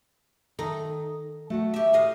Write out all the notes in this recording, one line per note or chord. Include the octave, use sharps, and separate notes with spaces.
D#3 D#4 A4
A3 F#4 F#5
G4 E5
A2 D#5 F5